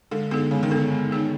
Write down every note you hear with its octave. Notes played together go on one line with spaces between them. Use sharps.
D3 G#3
D3 B3 D#4 G#4
C#3 G#3
D#3
D3 B3 D#4 G#4
G#3
B3 D#4 G#4